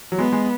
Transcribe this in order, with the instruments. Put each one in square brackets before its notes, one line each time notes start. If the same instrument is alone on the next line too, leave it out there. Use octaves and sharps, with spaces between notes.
[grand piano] F#3
[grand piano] G#3 [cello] B3
[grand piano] G#3